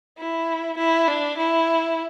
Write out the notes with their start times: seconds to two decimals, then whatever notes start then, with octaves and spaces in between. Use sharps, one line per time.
0.18 E4
0.78 E4
1.08 D4
1.38 E4